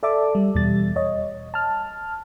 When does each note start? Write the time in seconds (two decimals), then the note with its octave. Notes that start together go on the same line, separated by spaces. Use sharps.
0.03 A4 D5 E5 A5 D6
0.35 G3
0.55 E2 B2 G3 A6
0.96 C#5 D#5
1.54 A5 F6